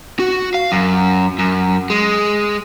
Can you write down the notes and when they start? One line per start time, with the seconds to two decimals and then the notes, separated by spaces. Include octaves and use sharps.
0.19 F#4
0.54 F5
0.72 F#2
1.39 F#2
1.90 G#3